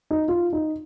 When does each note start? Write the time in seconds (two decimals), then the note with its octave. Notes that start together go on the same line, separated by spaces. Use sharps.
0.11 D#4
0.28 F4
0.53 D#4